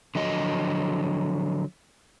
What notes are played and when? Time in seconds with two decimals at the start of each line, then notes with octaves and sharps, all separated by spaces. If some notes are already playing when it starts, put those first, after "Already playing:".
0.15 D3 F3 F#3 D#5